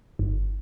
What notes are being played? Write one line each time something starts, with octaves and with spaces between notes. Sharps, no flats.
G1